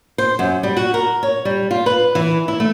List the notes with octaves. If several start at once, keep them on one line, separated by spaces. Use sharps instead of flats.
C5
F#2
G3
F#4
A#4
C#5
G3
F4
B4
E3
E4
A3